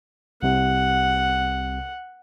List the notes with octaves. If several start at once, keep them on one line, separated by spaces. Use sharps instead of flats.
C2 C3 F#5